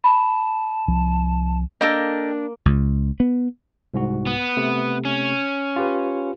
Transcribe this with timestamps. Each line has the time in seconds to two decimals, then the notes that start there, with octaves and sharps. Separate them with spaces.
0.04 A5 B5
0.88 C2 F3
1.81 A#3 D4 A4 A#4 D#5 G5
2.66 C#2
3.20 B3
3.94 C2 G#2 F#4
4.26 B3
4.57 C3 A3
5.05 C#4
5.76 F4 G4 B4